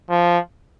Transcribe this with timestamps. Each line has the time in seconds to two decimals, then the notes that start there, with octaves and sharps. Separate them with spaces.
0.10 F3